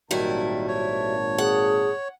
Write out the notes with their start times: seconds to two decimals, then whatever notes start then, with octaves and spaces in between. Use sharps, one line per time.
0.11 G#1 A#2 D#3 F#3 G3 E4 A5
0.68 C#5
1.38 G#4 F#5